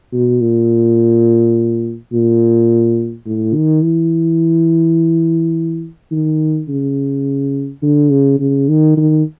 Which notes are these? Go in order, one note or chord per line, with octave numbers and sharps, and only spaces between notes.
B2
A#2
A#2
A2
D#3
E3
D#3
C#3
D3
C#3
C#3
D#3
D#3